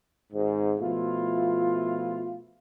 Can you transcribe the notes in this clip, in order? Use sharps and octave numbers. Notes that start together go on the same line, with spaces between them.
G#1 G#2
B2 F3 A3 E4 F4